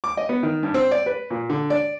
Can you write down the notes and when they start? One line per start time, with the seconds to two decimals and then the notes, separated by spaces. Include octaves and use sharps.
0.04 D6
0.17 D#5
0.29 B3
0.43 D#3
0.63 G2
0.74 C4
0.91 D5
1.06 B4
1.30 A#2
1.50 D3
1.70 D5